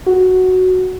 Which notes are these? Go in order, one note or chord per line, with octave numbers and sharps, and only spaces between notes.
F#4